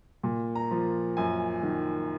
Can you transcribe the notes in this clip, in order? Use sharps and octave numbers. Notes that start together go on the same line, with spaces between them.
A#2
A#5
F3
F#2 G#5
D#3